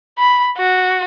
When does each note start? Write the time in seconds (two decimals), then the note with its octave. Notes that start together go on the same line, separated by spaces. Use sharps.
0.19 B5
0.58 F#4